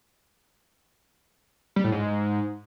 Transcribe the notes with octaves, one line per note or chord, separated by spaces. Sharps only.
G3
A2
G#2